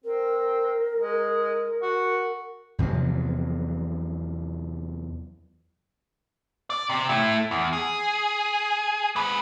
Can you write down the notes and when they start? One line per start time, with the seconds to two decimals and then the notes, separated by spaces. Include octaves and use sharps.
0.04 C4 A#4
0.97 G#3
1.82 F#4
2.79 E2 C3 F3 F#3
6.70 D5
6.90 C3
7.09 A3 E4
7.51 E2
7.73 G#4
9.16 G#3 B4